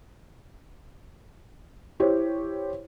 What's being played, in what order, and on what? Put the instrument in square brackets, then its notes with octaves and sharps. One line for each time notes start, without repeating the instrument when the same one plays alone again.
[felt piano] E4 G4 C5 C#5